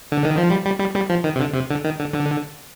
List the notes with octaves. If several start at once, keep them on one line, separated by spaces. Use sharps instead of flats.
D3
D#3
F3
G3
G3
G3
G3
F3
D#3
C3
D3
C3
D3
D#3
D3
D3